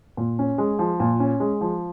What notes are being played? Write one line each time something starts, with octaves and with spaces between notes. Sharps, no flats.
A#2
C#4
G#3
F3
A#2
C#4
G#3
F3